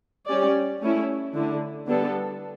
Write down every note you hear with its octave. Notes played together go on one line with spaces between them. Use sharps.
G3 C#4 G4 D5
A3 C#4 E4
D3 A3 E4
D3 G3 B3 D4 A4